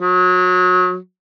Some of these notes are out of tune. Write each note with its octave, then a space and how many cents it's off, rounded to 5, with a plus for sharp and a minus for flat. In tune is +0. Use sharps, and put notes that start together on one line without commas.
F#3 -25